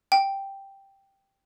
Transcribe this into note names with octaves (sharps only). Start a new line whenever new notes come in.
G5